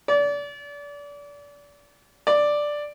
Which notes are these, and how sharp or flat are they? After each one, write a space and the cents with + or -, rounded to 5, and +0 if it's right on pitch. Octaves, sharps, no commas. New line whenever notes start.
D5 -30
D5 +5